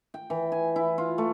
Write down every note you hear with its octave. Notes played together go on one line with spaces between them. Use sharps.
G5
E3
G#5
E4
F4
A3